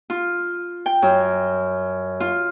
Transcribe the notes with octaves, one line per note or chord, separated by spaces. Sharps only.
F4
G5
F#2
F4